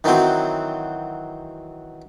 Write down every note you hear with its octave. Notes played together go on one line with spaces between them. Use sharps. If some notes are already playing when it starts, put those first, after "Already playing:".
D#3 E3 F#3 C4